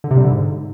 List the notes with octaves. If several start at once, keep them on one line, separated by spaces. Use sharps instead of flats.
D3
C3
G3
D3
G#2